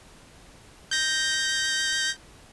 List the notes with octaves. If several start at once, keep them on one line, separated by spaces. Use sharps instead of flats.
G6 A#6